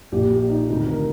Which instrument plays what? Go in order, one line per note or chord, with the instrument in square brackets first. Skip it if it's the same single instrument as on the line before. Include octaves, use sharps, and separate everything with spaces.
[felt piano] A#1 A#2 G4
G4
D#4
D2 C3 D#3 D#4
A#4